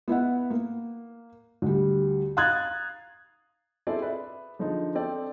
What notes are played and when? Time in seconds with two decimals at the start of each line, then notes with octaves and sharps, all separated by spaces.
0.08 B3 E4 E5 F#5
0.50 A#3
1.62 D2 G3
2.37 F5 A#5 D#6 F#6 G#6 A6
3.87 C4 E4 G#4 A4 D5
4.02 B4 E5
4.59 D3 F3 G#3 D#4
4.95 C4 A4 D5 G5